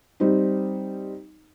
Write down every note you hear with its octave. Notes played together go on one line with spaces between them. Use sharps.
G3 C4 D#4